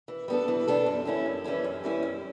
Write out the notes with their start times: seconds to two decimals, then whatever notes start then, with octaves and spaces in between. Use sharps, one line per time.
0.08 E3
0.28 G3 B3 D4 A4
0.48 E3
0.68 G3 B3 D4 A4
0.86 F#2
1.05 E3 G3 C#4 E4
1.26 F#2
1.44 E3 G3 C#4 E4
1.64 F#2
1.84 E3 G3 C#4 E4
2.03 F#2